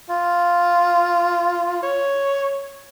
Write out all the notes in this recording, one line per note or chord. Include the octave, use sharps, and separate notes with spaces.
F4
C#5